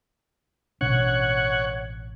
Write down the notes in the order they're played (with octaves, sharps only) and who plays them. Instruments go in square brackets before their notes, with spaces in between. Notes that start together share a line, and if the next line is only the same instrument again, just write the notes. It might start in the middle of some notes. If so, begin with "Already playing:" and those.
[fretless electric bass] A1 B2 D4 [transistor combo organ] C#5 F#5